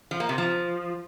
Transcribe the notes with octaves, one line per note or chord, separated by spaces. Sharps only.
F3
A#3
C3
F3